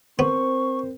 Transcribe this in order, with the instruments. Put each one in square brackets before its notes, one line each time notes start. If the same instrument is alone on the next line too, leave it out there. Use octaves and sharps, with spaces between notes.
[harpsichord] B3 [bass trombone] C4 [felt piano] A#4 C5 [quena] C#6